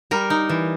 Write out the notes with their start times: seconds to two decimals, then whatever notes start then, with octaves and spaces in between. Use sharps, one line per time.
0.11 G3 A#4
0.30 D#4
0.49 E3